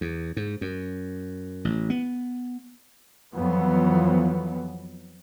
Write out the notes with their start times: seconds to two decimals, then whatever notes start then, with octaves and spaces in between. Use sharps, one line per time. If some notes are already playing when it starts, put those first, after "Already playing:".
0.01 E2
0.37 G#2
0.61 F#2
1.65 A1
1.90 B3
3.34 F2 E3 F#3 B3